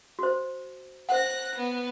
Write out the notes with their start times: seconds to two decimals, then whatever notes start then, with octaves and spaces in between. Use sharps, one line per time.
0.19 F#4 C5
1.09 C5 F#5 F#6 A#6
1.56 B3